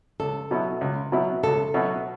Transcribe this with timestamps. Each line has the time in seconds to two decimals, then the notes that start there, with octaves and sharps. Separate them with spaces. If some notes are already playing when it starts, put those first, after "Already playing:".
0.20 C#2 A4
0.51 B2 F#3 B3 E4
0.81 C#2
1.12 B2 F#3 B3 E4
1.43 C#2 A4
1.74 B2 F#3 B3 E4